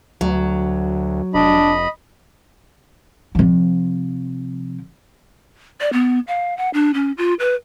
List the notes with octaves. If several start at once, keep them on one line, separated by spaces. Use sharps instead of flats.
D2 F#3
F1 D4 D#5 B5
C3 F3
D5
B3
F5
F#5
D4
C#4
F4
B4